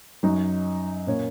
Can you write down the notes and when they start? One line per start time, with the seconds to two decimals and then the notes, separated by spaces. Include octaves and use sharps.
0.23 F#2 F#3 D#4
1.07 A#2 A#3 C#4 A#4 C#5